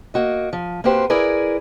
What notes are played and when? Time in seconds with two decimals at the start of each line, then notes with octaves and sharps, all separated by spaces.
0.14 A#3 F#4 D#5
0.53 F3
0.84 A#3 C4 F#4 G4 B4 C5
1.10 E4 G#4 A#4 B4 D5